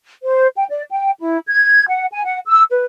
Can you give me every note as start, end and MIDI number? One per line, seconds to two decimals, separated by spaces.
0.23 0.47 72
0.56 0.64 79
0.69 0.83 74
0.90 1.11 79
1.20 1.38 64
1.48 1.83 92
1.88 2.05 78
2.12 2.24 80
2.25 2.38 78
2.47 2.63 88
2.71 2.85 71